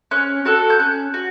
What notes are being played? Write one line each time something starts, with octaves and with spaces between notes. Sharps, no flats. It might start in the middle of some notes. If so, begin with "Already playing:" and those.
C#4 F#6
F#4 A4 F#6
G6
C#4 F#6
F#4